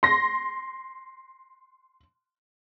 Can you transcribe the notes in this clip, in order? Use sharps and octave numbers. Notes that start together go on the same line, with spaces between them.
C6 A#6